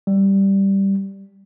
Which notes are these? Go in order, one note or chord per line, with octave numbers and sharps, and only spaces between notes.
G3